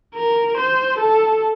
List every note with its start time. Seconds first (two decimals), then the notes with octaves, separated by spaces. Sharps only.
0.15 A#4
0.57 C5
0.98 A4